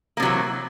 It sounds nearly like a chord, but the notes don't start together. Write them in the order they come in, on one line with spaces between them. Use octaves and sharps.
A#3 C3 F#3 E3